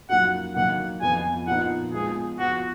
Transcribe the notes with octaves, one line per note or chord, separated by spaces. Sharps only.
F#2 F3 A#3 D#4 F#4 F#5
D#3 F#3 A#3 D#4 F#5
F2 F3 B3 G#5
A#2 F3 B3 D#4 F#5
F3 G#3 B3 G#4
F3 B3 F4 F#4